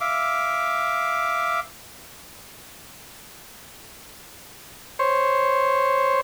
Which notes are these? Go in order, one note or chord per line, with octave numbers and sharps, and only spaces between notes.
E5 F5 D6
C5 C#5